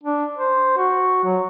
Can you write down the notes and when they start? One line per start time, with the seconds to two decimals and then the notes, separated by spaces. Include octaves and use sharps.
0.04 D4
0.36 C5
0.78 F#4
1.24 F#3